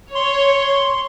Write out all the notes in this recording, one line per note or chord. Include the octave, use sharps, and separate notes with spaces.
C#5 C6